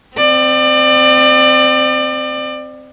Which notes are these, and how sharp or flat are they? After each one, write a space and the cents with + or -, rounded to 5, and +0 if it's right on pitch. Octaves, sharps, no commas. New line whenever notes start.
C4 -10 D5 +30